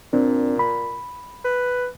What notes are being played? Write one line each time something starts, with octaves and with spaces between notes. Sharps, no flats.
A#2 C4 D4
B5
B4